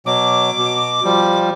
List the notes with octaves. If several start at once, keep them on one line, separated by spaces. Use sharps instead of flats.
B2 F#3 D6
B2
F3 G3